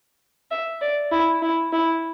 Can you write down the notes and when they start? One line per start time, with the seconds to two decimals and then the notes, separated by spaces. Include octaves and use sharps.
0.51 E5
0.81 D5
1.12 E4
1.42 E4
1.73 E4